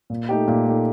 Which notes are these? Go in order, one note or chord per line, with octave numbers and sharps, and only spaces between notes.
A#2
A3 D#4 G4
A#2
A3 D#4 G4